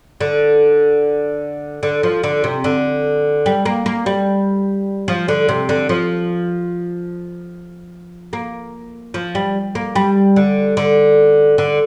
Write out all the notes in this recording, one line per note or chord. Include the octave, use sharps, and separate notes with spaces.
D3
D3
F3
D3
C3
D3
G3
A#3
A#3
G3
F3
D3
C3
D3
F3
A#3
F3
G3
A#3
G3
D3
D3
D3